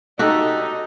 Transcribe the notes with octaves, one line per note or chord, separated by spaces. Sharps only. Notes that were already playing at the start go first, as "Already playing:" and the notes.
D#4 F#4 G4 A4